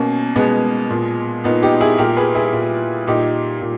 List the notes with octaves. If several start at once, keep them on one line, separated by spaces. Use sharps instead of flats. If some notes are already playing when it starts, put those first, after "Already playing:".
Already playing: B2 A#3 C#4
B2 G#3 B3
A#2
A#2 B3 D#4
D#4 G4
E4 G#4
A#2 G4 A#4
G#4 B4
E4 G#4
A#2
A#2 D#4 G4
A#2